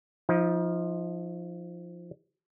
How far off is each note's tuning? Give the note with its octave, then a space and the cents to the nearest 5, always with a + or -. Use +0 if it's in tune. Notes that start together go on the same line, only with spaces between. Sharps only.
F3 +0 D#4 +35